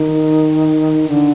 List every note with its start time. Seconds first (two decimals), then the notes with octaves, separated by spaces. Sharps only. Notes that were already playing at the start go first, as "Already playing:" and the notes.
Already playing: D#3
1.08 D3